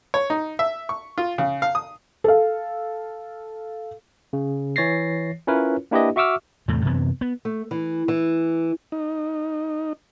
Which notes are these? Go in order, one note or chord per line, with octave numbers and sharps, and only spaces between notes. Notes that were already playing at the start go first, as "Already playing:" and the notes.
C#5
D#4
E5
C#6
F4
C#3
F5
D#6
A4 F5
C#3
E3 C#5 A6 A#6 C7
C#4 E4 F4 A#4 B4 C#5
A#3 D4 E4 G4 B4 D#5
F#4 E5 C#6 D6 E6 F6
E2 A2 C3 A3
F#2 C3 E3 B3
B3
A3
E3
E3
D#4